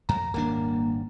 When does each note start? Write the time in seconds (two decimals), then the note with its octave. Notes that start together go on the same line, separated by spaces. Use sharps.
0.09 F2 A#5
0.34 D#1 G#1 A#3 D4